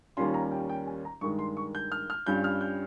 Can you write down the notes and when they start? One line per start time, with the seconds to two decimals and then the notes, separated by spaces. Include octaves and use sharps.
0.17 D#2 D#3 G3 C#4 F4 C6
0.34 A#5
0.52 G5
0.69 G5
0.87 G#5
1.05 A#5
1.21 G2 D#3 G#3 D#4 C#6
1.39 C6
1.57 C#6
1.75 G6
1.92 F6
2.10 F6
2.26 G2 G3 C#4 F4 G6
2.44 F6
2.61 G6